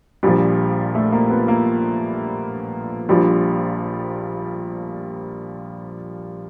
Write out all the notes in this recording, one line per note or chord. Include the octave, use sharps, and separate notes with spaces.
A#1 A#2 F3 G3
A3
A#3
B3
A#3
A#1 A#2 F3 G3